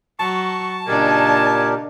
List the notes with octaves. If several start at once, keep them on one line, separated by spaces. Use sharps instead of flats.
F#3 A5 C#6
A#2 C#3 D4 D#4 G4 A#4 G#5